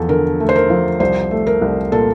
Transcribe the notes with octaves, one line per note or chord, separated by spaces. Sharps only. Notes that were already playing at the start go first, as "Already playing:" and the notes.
Already playing: E2 F3 A4
D3 A#4
A3
C5
A#4
F3
C2 C5
A3
A#4
C2
A#2 A4